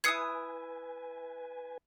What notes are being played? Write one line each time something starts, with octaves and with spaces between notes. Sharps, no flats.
E4 B4 G#5 D#6 F#6 G#6 C7 C#7